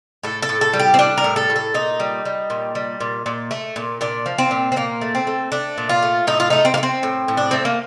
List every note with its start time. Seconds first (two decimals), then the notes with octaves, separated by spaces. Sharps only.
0.23 A2 A4
0.42 A4
0.49 A2
0.61 A4
0.73 G3
0.79 G4
0.94 C4
0.99 G3 D4
1.18 A#4
1.24 A2
1.36 A4
1.50 A2
1.56 A4
1.74 A#2 D#4
2.00 G3
2.25 G3
2.50 A#2
2.75 G3
3.00 A#2
3.26 A#2
3.51 A3
3.76 A#2
4.01 A#2 D4
4.26 F3
4.38 C4
4.51 A#2
4.72 C4
4.76 A#2 A#3
5.01 A3
5.15 C4
5.27 A3
5.52 A3 D4
5.78 A#2
5.89 F4
6.02 A3
6.27 A2 D#4
6.40 F4
6.50 A3 D#4
6.65 C4
6.74 A#3
6.77 A3
6.83 C4
7.03 A2
7.28 A2
7.37 D4
7.51 A3 C4
7.65 A#3